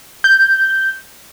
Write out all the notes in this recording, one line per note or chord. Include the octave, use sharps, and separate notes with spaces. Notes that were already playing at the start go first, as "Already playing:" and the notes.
G6